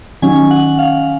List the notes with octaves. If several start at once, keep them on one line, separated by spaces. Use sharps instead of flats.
D#3 F#3 C#4 G#5
F#5
F5